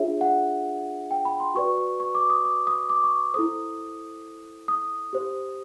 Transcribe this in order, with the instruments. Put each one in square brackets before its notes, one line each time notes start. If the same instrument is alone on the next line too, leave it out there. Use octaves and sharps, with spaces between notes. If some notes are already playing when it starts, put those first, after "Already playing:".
Already playing: [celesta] D4 F4 G#4 C#5 E5
F#5
G5
B5
C6
F#4 B4 D5 C#6
C#6
C#6
D6
D#6
D6
D#6
D6
C#6
E4 A4 C5 D#6
D#6
G4 C5